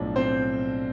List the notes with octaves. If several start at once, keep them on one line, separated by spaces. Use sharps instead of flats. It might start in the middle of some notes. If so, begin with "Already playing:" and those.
Already playing: B1 A2 F3 D4
C4 C5